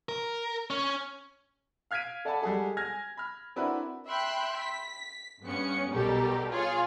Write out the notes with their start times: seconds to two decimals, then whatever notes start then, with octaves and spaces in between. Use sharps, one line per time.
0.09 A#4
0.70 C#4
1.91 F5 F6 G#6 B6 D7 D#7
2.25 A4 D5 F#5 G#5 A5 B5
2.42 G3 G#3 F#4 G#4 A4
2.77 G#5 F6 G#6 A#6
3.17 B5 F6
3.56 C4 D4 E4 F#4 A#4 B4
4.08 E5 G5 B5 C6 F#6
4.60 B6
5.43 G2 B3 C#4 C#7
5.92 B1 B2 G3 G4 A4 A#4
6.50 F4 G#4 C#5